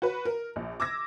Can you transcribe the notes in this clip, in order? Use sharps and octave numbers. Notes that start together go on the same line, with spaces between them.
F#4 B4
A#4
A#1
D6 E6 G#6 A#6